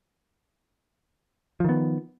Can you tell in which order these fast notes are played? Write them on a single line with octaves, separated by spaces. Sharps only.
F3 D#3 B3